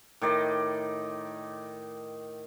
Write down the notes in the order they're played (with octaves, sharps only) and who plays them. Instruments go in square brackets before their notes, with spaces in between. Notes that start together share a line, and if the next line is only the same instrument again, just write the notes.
[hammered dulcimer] A2 D#3 D5 D#5